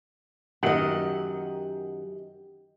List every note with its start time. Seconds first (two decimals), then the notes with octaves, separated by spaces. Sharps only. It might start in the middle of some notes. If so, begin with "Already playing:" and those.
0.63 F#2 D#3 G4 D#5 F#5